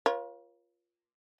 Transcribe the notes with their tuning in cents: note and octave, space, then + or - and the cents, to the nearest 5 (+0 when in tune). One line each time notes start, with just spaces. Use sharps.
F4 +0 A#4 +45 C#5 -10